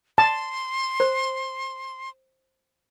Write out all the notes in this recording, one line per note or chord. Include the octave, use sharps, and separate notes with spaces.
A5 C6
C5